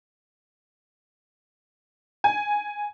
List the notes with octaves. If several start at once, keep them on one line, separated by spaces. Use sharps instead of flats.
G#5